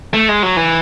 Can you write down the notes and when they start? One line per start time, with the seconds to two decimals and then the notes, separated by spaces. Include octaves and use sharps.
0.13 A3
0.29 G#3
0.43 F#3
0.57 E3